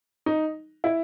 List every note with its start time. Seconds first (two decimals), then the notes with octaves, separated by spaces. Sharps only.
0.26 D#4
0.84 E4